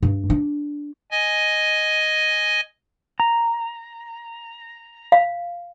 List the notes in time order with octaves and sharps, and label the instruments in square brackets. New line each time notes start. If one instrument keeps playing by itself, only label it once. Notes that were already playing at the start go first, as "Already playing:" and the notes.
[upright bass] G2
D4
[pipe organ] D#5 G#5
[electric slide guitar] A#5
[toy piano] F5